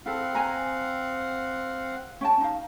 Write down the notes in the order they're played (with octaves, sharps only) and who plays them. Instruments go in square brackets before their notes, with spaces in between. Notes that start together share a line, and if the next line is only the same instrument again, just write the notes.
[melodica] C4 F5 F#5 [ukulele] E4 A4
[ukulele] B4 G#5 A#5
C#4 G5 A5
D#4 F5